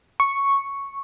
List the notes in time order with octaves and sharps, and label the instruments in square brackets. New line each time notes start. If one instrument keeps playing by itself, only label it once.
[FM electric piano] C#6